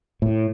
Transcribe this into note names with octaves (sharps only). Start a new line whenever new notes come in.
A2